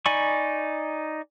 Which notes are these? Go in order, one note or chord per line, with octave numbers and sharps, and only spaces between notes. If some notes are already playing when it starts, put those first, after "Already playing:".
D#4 D5 G#5 B5 C#6